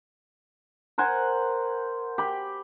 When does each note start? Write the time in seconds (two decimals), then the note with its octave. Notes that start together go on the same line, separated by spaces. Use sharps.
0.98 A#4 C5 F#5 G#5
2.18 G4 B5